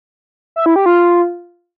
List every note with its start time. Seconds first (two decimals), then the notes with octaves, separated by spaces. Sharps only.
0.56 E5
0.66 E4
0.76 G4
0.86 F4